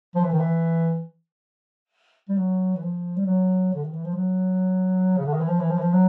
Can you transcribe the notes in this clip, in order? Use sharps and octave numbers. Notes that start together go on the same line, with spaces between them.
F3
E3
D#3
E3
G3
F#3
E3
F3
G3
F#3
D3
D#3
E3
F3
F#3
C#3
D3
D#3
E3
F3
E3
F3
E3
F3
F#3